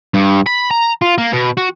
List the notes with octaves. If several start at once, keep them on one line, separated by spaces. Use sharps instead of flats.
G2
B5
A#5
F4
A#3
B2
F#4